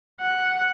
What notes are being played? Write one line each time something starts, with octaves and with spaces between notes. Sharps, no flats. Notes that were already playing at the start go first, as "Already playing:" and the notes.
F#5